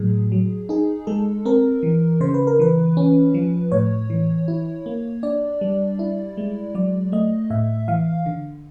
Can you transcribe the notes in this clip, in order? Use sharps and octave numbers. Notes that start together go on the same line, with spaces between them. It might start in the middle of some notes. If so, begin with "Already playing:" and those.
Already playing: A2 F#3 G#4
F#3
D#4 G#4
G#3 A4
C4 A#4
E3
C#3 C5
B4
A#4
E3 B4
C#4
F3
A2 C#5
E3
E4
A#3
D4 D5
G3
E4
G#3
F#3 D5
A3 D#5
A2 E5
E3 F5
D3